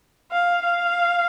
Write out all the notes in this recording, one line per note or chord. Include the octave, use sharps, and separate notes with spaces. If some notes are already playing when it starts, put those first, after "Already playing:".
F5
F5